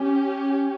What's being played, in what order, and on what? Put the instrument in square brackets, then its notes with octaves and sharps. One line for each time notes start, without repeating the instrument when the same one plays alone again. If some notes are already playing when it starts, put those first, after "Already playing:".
Already playing: [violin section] C#4 G4